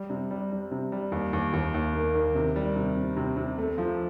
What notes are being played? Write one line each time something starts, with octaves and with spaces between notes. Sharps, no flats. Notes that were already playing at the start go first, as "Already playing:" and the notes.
Already playing: G3
C3
G3
G3
C3
G3
D#2
D#2
D#2
D#2
A#3
D#3
C3
G3
C3
C3
C3
C3
A3
F3